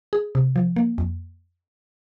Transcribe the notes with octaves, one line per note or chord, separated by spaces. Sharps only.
G#4
C3
F3
A#3
F2